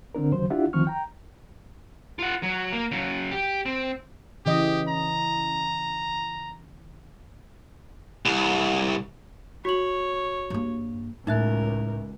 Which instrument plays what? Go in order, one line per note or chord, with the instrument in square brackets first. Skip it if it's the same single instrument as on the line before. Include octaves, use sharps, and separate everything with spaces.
[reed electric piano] D3 C4 D4 A#4
D#2 C#3 F#3 C5
D4 E4 F4 G4 E5 F#5
D2 D#3 F3 C4 C#6 F6
G5 A#5
[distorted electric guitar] F4 F#5
F#3
A#3
C#3 F#3
G4
C4
[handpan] C#3 E3 D#5 [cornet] G4
[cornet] A#5
[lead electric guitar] C2
[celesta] F#4 F#7 [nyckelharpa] C#5
[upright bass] G2 A#3
[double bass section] C#2 [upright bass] A2 [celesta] D#4 E5 F#6 [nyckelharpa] A#4